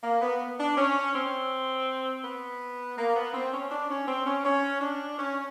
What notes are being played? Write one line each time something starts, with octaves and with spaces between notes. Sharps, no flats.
A#3
B3
D4
C#4
C4
B3
A#3
B3
C4
C#4
D4
C#4
C4
C#4
C#4
D4
C#4